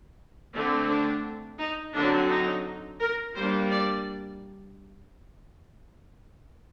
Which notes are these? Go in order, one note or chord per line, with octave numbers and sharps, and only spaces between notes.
D3 A3 C4
D4
D#4
D3 F#3 C4 D4
D#4
A#4
G3 A#3 D4 C5
D5